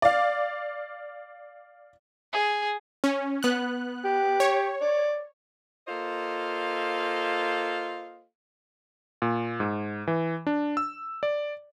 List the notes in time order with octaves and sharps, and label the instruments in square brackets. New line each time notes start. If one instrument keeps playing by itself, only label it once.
[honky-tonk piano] D5 F5
[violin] G#4
[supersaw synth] C#4
B3 F#6
[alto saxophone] G4
[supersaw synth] C#5
[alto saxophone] D5
[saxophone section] A#3 F4 A4 C5 D#5 F5
[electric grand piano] A#2
G#2
E3
D4
E6
D5